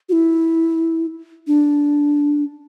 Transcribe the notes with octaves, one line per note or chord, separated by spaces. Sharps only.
F#4
E4
D4